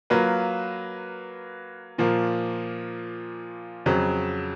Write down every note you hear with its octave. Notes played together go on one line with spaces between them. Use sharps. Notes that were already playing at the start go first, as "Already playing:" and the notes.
F#3 A#3 F4 B4
A#2 F3 A#3
F2 C#3 F#3